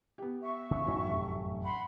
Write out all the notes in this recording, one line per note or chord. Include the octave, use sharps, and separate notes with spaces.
B3 G4
E5 C#6
C#3 G#3
A1 F#2 D#3 F#3 C#4 D#4
F1
F#5 B5 C6